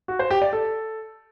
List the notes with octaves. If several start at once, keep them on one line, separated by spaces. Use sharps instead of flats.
F#4
C5
G4
D5
A4